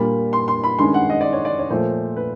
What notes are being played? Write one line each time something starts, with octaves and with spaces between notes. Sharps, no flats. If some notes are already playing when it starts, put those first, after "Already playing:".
Already playing: A#2 G3 A#3 D4 B5
C6
C6
B5
G2 D#3 G#3 C#4 C6
F#5
D#5
D5
C#5
D5
C#5
A#2 F3 A3 C5
B4